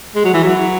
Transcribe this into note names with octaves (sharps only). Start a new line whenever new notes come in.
G#3
F#3
E3
F#3